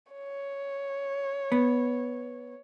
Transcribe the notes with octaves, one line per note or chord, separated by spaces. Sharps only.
C#5
B3